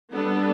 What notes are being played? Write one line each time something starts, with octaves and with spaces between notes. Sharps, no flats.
G3 B3 D4 A4